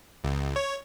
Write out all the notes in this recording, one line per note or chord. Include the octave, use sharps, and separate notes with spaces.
C#2
C#5